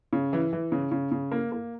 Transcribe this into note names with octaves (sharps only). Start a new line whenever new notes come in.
C#3
E3
E3
C#3
C#3
C#3
A#3
A#3